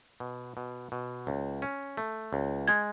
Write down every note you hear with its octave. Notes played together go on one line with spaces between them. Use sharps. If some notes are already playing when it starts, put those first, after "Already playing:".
B2
B2
B2
C#2
C#4
A3
C#2
G#3 G#6